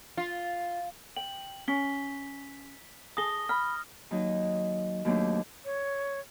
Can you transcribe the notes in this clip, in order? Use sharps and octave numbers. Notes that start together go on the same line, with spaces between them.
F4
G5 F#7
C#4 B6 G7
G#4 A5 D#6 A#6 G7
B5 F6
D#2 F#3 D#4
D#2 F#3 A3 C4 D4
C#5